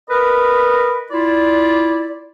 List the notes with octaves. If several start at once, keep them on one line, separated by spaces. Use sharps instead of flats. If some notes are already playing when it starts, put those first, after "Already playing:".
A#4 B4 D#5 B5
E4 F4 D5